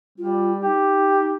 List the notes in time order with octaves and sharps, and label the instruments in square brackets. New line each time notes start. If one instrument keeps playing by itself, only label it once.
[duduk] G3 [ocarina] F4
[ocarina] D#4 [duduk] G4